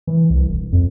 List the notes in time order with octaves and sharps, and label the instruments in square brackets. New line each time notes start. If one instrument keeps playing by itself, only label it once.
[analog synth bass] E3
C2
E1
F2